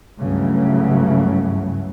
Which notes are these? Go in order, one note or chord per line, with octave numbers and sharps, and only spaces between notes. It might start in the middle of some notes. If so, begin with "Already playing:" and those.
C#2 G2 C#3 E3 F#3 A3